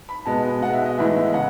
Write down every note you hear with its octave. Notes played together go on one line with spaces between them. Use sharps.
B5
B2 G#3 B3 A5
D#5
B2 G#3 B3 F#5
E5
D#5
A2 E3 G#3 B3 E5
E5
C#3 F#5